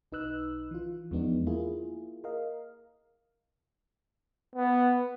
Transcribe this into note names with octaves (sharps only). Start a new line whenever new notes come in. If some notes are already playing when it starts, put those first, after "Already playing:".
B1 D#4 B4 E6 F#6
E3 F4
E2 F3 G#3 B3 D4 D#4
A#3 E4 F4 G#4
A#4 D#5 F5
B3